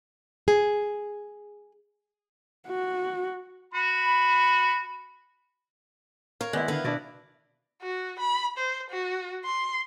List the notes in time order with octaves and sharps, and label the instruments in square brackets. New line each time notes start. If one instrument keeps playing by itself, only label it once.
[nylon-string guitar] G#4
[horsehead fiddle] F#4
[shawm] F#4 [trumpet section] B5
[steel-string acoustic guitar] A#4 C#5 [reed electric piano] F5
[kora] D#3 E4 [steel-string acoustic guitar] G#3 [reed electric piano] B3 D5 F#6
[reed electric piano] D3 A4 [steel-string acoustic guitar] B3 [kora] F5 F#5
[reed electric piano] B2 D4 [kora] E4 F#4 D5
[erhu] F#4
B5
C5
F#4
C6